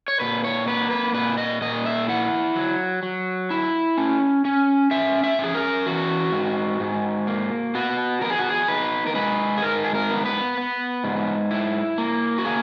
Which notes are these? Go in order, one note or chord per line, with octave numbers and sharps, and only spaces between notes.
C#5
A#2 B4
C#5
A#3 B4
B4
A#2 B4
D#5
A#2 D#5
E5
E4 F#5
F#3
F#3
E4
C#4
C#4
C#4 E5
E5
C#4 G#4
A#4
E3 F#4
G#2
G#2
A#3
B3 F#4
B3 A#4
G#4
F#4
G#4
D#4 B4
A#4
G#3 B4
G#4
G#2 A#4
G#4
A#4
B3
B4
B3
G#2
E4
A#3
F#4
A#3 G#4